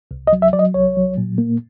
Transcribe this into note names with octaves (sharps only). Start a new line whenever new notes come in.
C2
D#5
F#3
E5
F#3 D5
D#5
C2 C#5
F#3
A#2
A#3